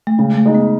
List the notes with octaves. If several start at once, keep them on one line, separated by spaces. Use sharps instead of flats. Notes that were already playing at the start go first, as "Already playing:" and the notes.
A3
C#3 G#3
A3
G#3 D#4
B3